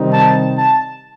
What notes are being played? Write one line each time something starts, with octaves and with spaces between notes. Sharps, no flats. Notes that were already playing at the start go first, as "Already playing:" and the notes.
Already playing: C3 D#3 G3 C4 D#4
A5
A5